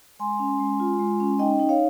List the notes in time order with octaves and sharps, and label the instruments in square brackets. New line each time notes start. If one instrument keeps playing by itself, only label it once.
[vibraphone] G#3 G#5 C6
C#4
G#3
F4
G#3
C#4
D#4 D#5 G5
D#4
C#5 F5